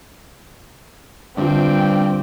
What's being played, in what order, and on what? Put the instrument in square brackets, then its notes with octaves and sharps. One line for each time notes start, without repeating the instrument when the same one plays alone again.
[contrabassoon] G2 [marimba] D3 G3 F4 [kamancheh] C4 G5